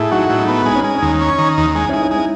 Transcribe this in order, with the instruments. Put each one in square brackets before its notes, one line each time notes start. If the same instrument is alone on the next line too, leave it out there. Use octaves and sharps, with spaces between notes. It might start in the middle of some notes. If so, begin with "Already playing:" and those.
Already playing: [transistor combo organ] A2 [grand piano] E4 G#4 A4
[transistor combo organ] F#3 [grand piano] D#4 F#4
[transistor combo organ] A2
[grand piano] D#4
[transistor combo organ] B3
[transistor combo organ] G#3 [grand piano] D#4
[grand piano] C#4
[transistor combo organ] G#3
[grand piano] C#4
[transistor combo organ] D#2
C#4
D#3
D#2
[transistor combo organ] G#3 [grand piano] D#4
[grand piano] C#4 E4
[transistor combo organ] G#3 [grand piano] D#4
[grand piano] C#4 E4
[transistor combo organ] G#3
[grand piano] C#4 E4